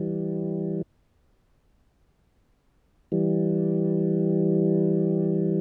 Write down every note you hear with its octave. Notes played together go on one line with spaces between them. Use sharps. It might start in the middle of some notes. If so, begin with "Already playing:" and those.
Already playing: E3 G3
E3 G3